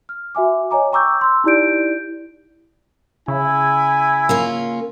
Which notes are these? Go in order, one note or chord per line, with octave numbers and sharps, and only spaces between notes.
F6
F#4 E5 G#5 D6
C#5 D#5 G#5 A#5 D6
G5 A#5 C#6 D6 E6 G6
C6 E6
D#4 E4 G4 D5 G6 D7
C#3 E4 G#5
A#3 C#4 F4